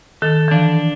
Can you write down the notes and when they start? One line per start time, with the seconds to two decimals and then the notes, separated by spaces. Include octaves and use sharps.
0.22 D#3 A4
0.48 E3
0.51 F3 D4